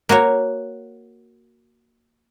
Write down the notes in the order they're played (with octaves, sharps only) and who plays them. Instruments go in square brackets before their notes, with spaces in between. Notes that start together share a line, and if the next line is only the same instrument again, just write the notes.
[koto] A#3 F#4 A#4 C#5